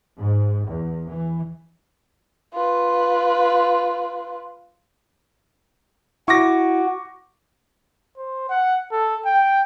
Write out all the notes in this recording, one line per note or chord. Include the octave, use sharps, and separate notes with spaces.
G#2
E2
E3
F4 B4
E4 F#4 C#6 D6 A#6
C5
F#5
A4
G5